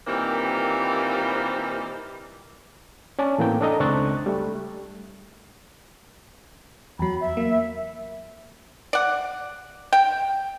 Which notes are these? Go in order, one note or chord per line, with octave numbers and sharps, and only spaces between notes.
A#2 D#3 E3 G3 A#3 C4
C#4 D5 A5
A2 E3 A#3 C4 G5
D4 A4 D#5 A#5
C#2 C4 D4 C#6 F#6 A6
G3 A3
E2 F#3 B5
E5
A#3
D5 F#5
G5